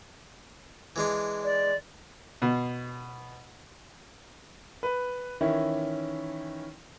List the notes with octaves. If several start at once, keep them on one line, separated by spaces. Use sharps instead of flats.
E3 G#3 D4
D5
B2
B4
D#3 E3 C#4 E4